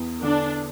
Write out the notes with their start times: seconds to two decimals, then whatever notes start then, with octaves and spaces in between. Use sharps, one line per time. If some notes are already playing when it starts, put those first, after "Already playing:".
Already playing: E2
0.23 D3 D4